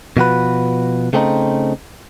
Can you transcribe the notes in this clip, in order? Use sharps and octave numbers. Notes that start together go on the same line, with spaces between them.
B2 F3 F#4 B4
C#3 A3 C4 D4 D#4